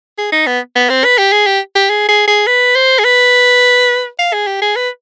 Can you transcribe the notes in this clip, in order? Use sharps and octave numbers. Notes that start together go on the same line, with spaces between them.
G#4
D#4
B3
B3
C4
B4
G4
G#4
G4
G4
G#4
G#4
G#4
B4
C5
G#4
B4
F5
G#4
G4
G#4
B4